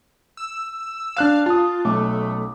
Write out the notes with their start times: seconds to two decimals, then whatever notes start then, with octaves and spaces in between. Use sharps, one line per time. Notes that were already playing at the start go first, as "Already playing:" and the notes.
0.37 E6
1.17 D4 F5 F#6 E7
1.46 F4 A5 D#6
1.85 B1 A3 C#4 D6